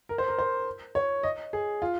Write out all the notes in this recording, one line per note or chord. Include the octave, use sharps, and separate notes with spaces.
A#4
C5
A#4
C5
C#5
D#5
G#4
F4